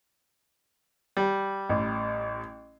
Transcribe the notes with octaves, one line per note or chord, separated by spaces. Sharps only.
G3
A1